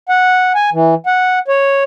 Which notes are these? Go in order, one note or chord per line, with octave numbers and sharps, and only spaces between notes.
F#5
G#5
E3
F#5
C#5